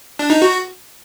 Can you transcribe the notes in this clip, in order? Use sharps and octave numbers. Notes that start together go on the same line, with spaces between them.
D4
D#4
F#4